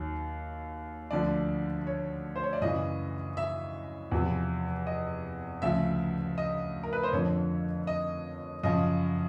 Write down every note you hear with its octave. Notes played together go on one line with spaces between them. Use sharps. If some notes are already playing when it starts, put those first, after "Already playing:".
Already playing: D#2 D#3 F#3
D2 D3 F3 D5
C#5
C5
C#5
D5
F#2 C#3 E3 D#5
E5
E2 C3 F3
D#5
D2 C#3 F3 E5
D#5
A#4
B4
C5
F2 D3 F3 C#5
D#5
F#2 C#3 F3 D#5